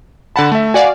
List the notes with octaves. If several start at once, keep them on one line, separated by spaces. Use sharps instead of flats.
D3 F#5 A5 B5
A3 E5
F#4 D5 F5 G#5